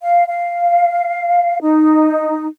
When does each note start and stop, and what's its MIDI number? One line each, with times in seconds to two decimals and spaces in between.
0.02 0.23 77
0.27 1.58 77
1.61 2.46 63